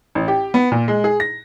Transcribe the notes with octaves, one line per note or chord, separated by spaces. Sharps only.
A1
G4
B3
A#2
G#3
G#4
A#6